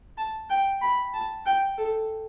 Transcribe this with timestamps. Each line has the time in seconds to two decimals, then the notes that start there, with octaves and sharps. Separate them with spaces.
0.18 A5
0.50 G5
0.82 B5
1.13 A5
1.46 G5
1.78 A4